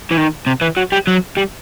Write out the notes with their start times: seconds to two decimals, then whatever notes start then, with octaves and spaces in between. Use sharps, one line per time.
0.11 E3
0.17 D#3
0.46 C3
0.61 E3
0.77 F#3
0.92 G3
1.07 F#3
1.37 G3